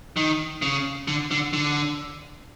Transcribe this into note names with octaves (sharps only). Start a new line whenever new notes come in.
D#3
C#3
D3
D3
D3